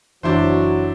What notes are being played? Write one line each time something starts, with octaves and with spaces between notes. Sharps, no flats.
F#1 E3 F#3 D4 E4 C5